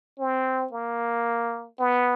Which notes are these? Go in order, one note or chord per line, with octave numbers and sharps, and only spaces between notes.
C4
A#3
B3